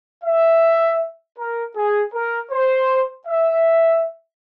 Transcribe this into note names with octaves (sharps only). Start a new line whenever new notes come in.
E5
A#4
G#4
A#4
C5
E5